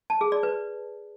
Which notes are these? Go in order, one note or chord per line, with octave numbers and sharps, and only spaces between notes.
A5
G#4
D5
B4